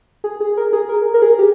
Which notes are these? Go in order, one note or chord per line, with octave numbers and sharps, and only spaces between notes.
G#4
G#4
A#4
G#4
A#4
A#4
G#4
G4